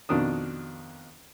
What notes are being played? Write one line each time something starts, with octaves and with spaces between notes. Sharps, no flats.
F2 B2 D#3 D4 D#6